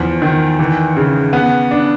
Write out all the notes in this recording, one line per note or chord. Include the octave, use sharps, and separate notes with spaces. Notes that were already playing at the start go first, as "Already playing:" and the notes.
Already playing: E2 F3
D#3
E3
C#3
B3
D4